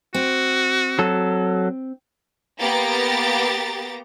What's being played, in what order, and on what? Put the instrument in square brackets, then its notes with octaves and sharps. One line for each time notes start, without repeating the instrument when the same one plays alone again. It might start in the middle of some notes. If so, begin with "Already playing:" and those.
[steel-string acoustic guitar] C4 [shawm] F#4
[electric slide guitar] F#3 A4
[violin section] A#3 B3 G4 A#5 A6